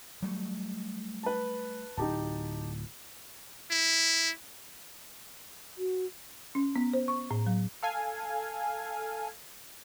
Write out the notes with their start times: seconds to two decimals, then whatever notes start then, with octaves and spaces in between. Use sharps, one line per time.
0.22 F#3 G3 A3
1.23 B4 A5
1.97 D1 D#4 G4 A5
3.71 E4
5.78 F#4
6.55 C#4
6.76 B3
6.93 C5
7.08 C#6
7.31 A2
7.46 F#3
7.83 A4 F5 G#5